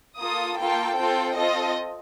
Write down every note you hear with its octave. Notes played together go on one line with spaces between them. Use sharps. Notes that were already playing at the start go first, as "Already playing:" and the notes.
A#3 F4 A4 D#6
A#3 F4 A4 G5
C4 F4 A4 G5
C4 F4 A4 D#5